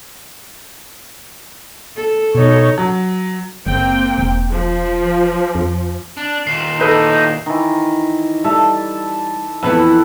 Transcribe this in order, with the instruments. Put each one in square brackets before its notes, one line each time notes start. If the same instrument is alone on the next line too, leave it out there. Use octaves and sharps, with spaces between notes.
[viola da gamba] A4
[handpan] B2 [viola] D#4 C#5
[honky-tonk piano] F#3
[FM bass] F#1 [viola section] A#3 C4 G5
[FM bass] E1
[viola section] F3
[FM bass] F2
[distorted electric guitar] D4
[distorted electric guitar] D#2 A#2 [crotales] C7 E7
[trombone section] A2 D#4 [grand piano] A4 B4 G6
[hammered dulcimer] D#3 E3
[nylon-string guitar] G3 [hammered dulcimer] A4 E5 A5
[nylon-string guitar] F2 E3 B3 [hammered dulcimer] A4 B4 F#5